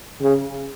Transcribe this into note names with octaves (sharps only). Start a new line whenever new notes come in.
C#3